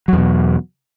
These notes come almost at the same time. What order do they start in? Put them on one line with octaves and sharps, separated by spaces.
F#3 E2 B2